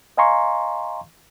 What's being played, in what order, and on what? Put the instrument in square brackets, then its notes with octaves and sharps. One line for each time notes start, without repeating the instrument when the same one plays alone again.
[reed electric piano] D#5 F5 G#5 A#5 C6 C#6